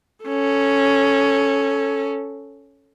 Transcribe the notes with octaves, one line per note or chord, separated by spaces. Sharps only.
C#4 A4